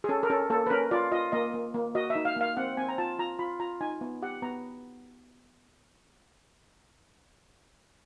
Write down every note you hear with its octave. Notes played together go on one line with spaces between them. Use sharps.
G#4
C#4 A4
A#4
C#4 A4
A#3 A4
B4
C#4 A#4
F4 D5
F4 D#5
A#3 D#5
A#3
A#3
F#4 D#5
E5
D#4
F5
A#3 F5
C4 F#5
C4 G#5
A#5
F4 A5
F4 A#5
F4 B5
F4 A#5
D#4 G#5
B3
G4 F#5
B3 A#5